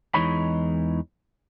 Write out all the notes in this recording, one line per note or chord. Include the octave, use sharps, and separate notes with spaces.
E2 E3 G#3 D#4 C#5 B5